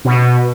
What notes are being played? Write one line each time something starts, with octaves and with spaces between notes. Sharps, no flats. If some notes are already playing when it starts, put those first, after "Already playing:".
B2